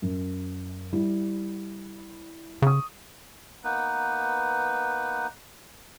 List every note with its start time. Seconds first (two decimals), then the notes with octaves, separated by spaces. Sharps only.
0.02 F#2
0.93 G3 E4
2.62 C#3 C#6 D#6
3.64 A#3 B3 D#4 B4